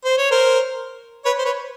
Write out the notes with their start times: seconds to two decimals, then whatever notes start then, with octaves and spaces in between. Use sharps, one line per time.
0.05 C5
0.18 C#5
0.31 A#4 C5
1.25 B4 C#5
1.39 C5
1.45 B4 C#5